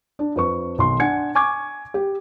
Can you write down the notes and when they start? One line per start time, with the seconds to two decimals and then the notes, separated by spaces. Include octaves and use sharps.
0.19 D4
0.36 F2 B4 C#6
0.78 B1 D#3 C6
1.00 D4 F#5 G#5 G#6 C#7
1.35 G#5 C#6 D6 G#6
1.94 G4